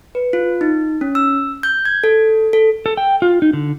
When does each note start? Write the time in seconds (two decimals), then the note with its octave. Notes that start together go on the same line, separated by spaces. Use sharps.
0.15 B4
0.33 F4
0.61 D#4
1.01 C#4
1.15 E6
1.63 G6
1.85 G#6
2.04 A4
2.53 A4
2.86 A4
2.97 G5
3.22 F4
3.42 D#4
3.53 D3